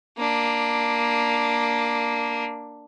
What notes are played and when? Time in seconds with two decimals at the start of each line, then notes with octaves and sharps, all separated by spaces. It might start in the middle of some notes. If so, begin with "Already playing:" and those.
0.18 A#3 D4